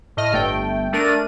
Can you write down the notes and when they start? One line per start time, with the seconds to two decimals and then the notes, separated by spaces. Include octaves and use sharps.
0.17 A2 D#5 F6
0.32 G1 A3 G5
0.93 A3 D4 A#4 D#7